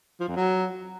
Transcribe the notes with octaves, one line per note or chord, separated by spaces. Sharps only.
F3
F2
F#3